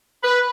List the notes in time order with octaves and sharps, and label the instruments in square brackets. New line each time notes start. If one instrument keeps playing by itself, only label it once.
[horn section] B4